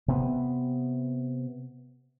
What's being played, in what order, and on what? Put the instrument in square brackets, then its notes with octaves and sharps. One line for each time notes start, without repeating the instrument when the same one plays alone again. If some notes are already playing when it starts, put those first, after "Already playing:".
[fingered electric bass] C3 B3